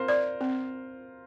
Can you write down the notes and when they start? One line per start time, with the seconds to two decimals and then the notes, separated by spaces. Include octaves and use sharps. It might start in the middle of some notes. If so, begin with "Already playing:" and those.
Already playing: C4 F4 A#4 C5
0.08 D5
0.41 C4